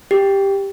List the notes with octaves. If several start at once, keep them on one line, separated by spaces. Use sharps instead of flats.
G4